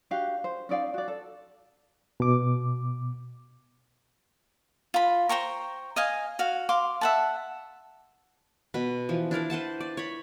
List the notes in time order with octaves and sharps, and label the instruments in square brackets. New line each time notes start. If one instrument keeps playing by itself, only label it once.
[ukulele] D4 F#4 G4 F5
C5
C#4 D#4 D5 F5
F#4 D5
A4
[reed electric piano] B2 D6
[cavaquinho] F4 B5
C5 G5 A#5 C#6
D#5 F5 G#5
F#4 F5
F5 C6 D6
E5 F#5 A5
[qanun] B2 B4
E3 F3
D4 E4 A#4 D5
B4 C5 F#5 A5
D5
C#5 B5